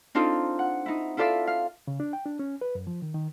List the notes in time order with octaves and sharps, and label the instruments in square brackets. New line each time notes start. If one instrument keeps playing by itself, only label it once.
[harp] C4 D4 D#4 F4 A4
F#5
D#4 E4
E4 F4 A4 D5 E5 F5
F5
[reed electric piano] C#3
D4
G5
D4
C#4
B4
F#2
F3
D#3
D#3